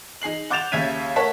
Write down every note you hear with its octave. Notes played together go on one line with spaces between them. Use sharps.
D#4 G#4 C7 F#7
F#5 D6 G6 A6 E7 F7
D#2 C#3 E5 G#6 B6 D#7
A3 A#4 C#5 F#5 A5 B6